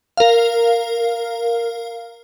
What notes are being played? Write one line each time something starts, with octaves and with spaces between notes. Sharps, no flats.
A#4 F5